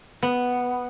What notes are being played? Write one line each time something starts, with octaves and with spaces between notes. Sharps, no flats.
B3